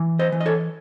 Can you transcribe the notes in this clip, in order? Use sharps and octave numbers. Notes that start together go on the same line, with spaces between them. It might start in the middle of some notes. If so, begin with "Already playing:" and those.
Already playing: E3
C5 D#5
E3
D#5
A4 C#5